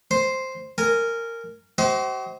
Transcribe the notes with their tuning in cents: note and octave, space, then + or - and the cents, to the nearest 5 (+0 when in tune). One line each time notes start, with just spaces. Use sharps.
C5 +0 C6 +0
A#4 -15 G#5 +0
F#4 +45 C5 +0 D#5 +40